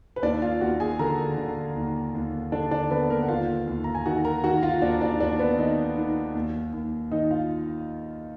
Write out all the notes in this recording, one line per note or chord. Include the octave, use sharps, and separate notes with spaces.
B4
D#2 D4 D5
F4 F5
D#2 F#4 F#5
G#4 G#5
D3 A#4 A#5
D3
D#2
D#2
D3 D4 D5
D4 D5
D3 B3 B4
A#3 A#4
F#5
D#2 F4 F5
D#2
A#5
G#5
D#3 F#4 F#5
A#4 A#5
D#3 F#4 F#5
F4 F5
D#2 D4 D5
D4 D5
D#2 D4 D5
B3 B4
D#3 D#4 D#5
D#3
D#2
D#2
D#3 D#4 D#5
F4 F5